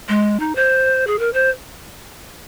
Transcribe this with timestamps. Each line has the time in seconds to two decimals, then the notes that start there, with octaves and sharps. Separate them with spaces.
0.09 G#3
0.40 D#4
0.55 C5
1.07 G#4
1.19 A#4
1.33 C5